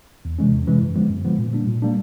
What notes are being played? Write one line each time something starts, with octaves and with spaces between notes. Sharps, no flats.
E2
C3 E3 G#3 C#4
E2
C3 E3 G#3 C#4
F#2
D3 F3 G#3 B3
F#2
D3 F3 G#3 B3
A#2
G3 A#3 D4
A#2
G3 A#3 D4